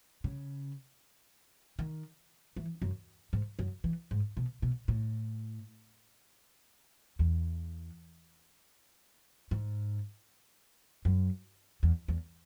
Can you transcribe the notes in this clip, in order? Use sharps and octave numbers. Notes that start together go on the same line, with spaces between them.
C#3
D#3
E3
F#2
G#2
F#2
E3
G#2
B2
B2
A2
E2
G#2
F#2
E2
E2